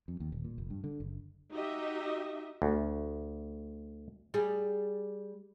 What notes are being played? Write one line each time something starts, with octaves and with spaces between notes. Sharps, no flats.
F2
D#2
D#1
A#2
F1
G2
D3
F#1
D#4 F#4 G4 D#5 E5
D2
G3 G#4